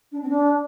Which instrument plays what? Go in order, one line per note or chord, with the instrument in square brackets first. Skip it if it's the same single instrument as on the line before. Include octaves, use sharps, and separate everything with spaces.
[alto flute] D4
C4
D4